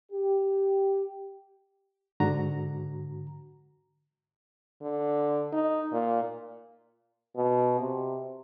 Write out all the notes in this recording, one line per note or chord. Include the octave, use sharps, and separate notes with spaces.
G4
G#2 D3 F#4 A#5
D3
D#4
A#2
B2
C3